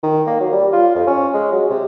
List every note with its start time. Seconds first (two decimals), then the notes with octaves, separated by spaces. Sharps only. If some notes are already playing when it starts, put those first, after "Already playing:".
0.03 D#3
0.27 A#3
0.40 F#3
0.52 G3
0.72 F4
0.95 F2
1.07 C#4
1.33 G#3
1.52 F#3
1.70 C3